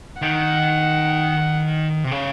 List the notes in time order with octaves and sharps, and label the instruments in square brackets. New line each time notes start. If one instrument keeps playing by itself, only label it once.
[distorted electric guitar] D#3 [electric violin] F#5
[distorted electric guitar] C3
C#3